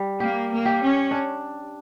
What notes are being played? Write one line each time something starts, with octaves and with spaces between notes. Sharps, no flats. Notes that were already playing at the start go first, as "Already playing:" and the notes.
Already playing: G3
A#3 G4
A#3
G4
C#4
D4